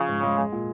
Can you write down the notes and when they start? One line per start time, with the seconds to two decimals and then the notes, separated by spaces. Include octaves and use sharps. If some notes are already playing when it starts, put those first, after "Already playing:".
Already playing: C#3 F3
0.08 G#2
0.23 G#3
0.38 G#3
0.52 A#2